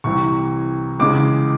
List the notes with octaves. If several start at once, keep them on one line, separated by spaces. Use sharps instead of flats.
C2 C3 E3 G3 C#6
C#2 C#3 E3 G#3 D6